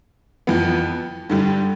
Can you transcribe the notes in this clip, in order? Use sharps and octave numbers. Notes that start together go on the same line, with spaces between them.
F2 E3 B3
G2 D3 G3